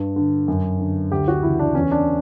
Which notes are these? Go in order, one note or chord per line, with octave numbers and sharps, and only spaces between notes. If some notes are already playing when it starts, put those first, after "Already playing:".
Already playing: G2
D3
F#2
D3
D2 G4
F#4
C#3 E3 E4
D4
E2 C#4
D4